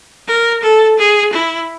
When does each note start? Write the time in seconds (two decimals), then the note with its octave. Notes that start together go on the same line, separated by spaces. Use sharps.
0.28 A#4
0.63 A4
0.99 G#4
1.33 E4